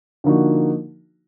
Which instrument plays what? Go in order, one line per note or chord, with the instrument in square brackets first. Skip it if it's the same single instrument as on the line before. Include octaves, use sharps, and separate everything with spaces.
[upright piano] D3 F3 A#3 D#4 F#4